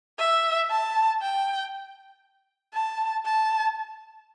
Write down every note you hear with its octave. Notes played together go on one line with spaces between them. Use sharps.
E5
A5
G5
A5
A5